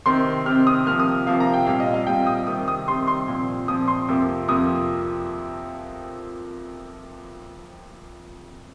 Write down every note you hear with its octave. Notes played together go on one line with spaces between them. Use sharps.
C3 D#3 C4 C6
C3 D#3 C4 F6
D#6
C3 F3 A#3 F6
D#6
C3 F3 A#3 F5
A#5
G5
A#2 G3 C4 F5
D#5
F5
A#2 G3 C4 G5
D#6
C3 D#3 G3 C4 D#6
D#6
C3 D#3 G3 C4 C6
C6
A#2 F3 C4
A#2 F3 C4 D#6
C6
F2 C3 F3 A#3
F2 C3 F3 A#3 D#6